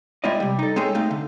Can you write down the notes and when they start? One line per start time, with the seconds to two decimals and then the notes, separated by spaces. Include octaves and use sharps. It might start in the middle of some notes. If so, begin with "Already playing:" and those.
0.24 G#3 C4 E4 F4 D5 D#5
0.40 C3 G3
0.59 D#4 A4
0.76 G#3 C4 C#4 G#4 A4
0.95 A3 C4 D#4 F5
1.11 D3